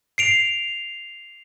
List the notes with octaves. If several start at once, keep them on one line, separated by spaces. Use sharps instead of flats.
C7 D7 F7